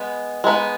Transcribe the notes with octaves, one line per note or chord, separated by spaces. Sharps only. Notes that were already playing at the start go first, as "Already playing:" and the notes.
Already playing: G#3 B3
G#3 B3 D#4